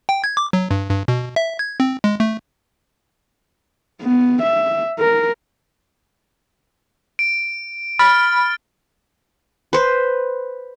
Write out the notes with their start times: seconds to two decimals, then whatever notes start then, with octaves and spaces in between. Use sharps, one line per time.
0.09 G5
0.24 G#6
0.37 D6
0.53 F#3
0.71 G2
0.90 G2
1.08 B2
1.36 E5
1.59 G#6
1.80 C4
2.04 G#3
2.20 A3
4.01 B3
4.42 E5
4.99 A#4
7.19 D7
7.99 B5 F6 A6 D7
9.73 B4 C5